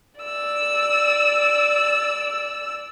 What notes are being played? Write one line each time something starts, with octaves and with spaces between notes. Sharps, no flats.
D5 E6